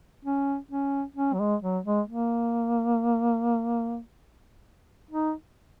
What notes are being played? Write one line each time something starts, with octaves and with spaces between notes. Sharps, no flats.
C#4
C#4
C#4
F#3
G#3
F#3
G#3
A#3
D#4